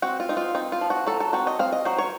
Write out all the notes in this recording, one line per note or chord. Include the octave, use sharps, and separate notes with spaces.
C4 F#4
F4
D#4
F4
C4 D#4
F4
F3
F#4
F#3 A4
A4
C4 F#4
D#5
C4 F5
D#5
F#3 C5
C#5